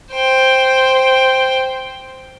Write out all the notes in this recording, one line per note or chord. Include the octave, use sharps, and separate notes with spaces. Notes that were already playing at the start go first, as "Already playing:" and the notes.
C5 G5